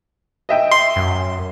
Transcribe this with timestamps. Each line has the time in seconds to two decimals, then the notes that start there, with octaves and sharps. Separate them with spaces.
0.49 D#5 E5 G5
0.72 C6
0.96 F#2